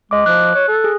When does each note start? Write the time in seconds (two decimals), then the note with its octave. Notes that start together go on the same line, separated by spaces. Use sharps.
0.11 G#3 D#5 D6
0.26 F3 F#6
0.55 C#5 F#6
0.68 A4
0.84 G#4